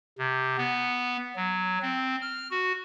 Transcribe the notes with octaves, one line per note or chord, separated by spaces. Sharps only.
C3
B3
F#3
C4
F6
F#4